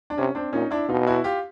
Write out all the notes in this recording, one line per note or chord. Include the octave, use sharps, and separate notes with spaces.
D4
C3 C#4
C4 D4
A#2 C#4 D#4
D4 E4
B2 D#4 F4
E4 F#4
F4 G4